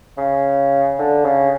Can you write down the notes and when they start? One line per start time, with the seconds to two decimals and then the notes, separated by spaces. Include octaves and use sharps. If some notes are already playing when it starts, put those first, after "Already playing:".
0.18 C#3
0.99 D3
1.25 C#3